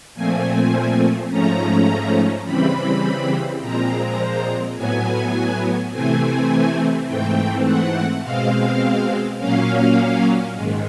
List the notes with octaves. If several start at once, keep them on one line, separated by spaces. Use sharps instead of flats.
A#2 F3 A3 C4 G#5
G#2 F3 A3 C#4 A#5
C#3 E3 G3 C4 B5
A#2 F3 G#3 C4 A#5
A2 F#3 B3 G#5
C3 E3 A3 C4 G#5
G#2 E3 A3 C4 G5
F#5
B2 G#3 C4 F5
A#2 F#3 A#3 C#4 F5
G#2 D#3 G#3